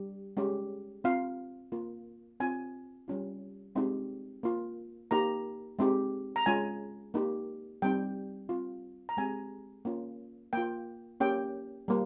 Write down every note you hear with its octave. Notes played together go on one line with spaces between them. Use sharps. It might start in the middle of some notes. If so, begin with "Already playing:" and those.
Already playing: G3 G4
G#3 C#4 G4
C4 F4 F5
A#3 F4
C4 F4 G#5
G3 C#4 F4
G#3 C4 D#4 G4
A#3 F4
A#3 D#4 G4 A#5
G#3 C4 D#4 G4
A#5
G#3 C#4 F4 G#5
A#3 D#4 G4
G3 C4 D#4 G5
C4 F4
A#5
G#3 C4 G4 G#5
A#3 C#4 F4
A#3 F4 G5
A#3 C#4 G4 G5
G3 A#3